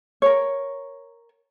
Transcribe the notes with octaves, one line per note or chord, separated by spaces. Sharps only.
A#4 C#5